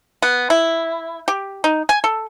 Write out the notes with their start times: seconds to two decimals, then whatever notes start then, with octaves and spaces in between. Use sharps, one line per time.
0.22 B3
0.50 E4
1.28 G4
1.64 D#4
1.89 G#5
2.04 A4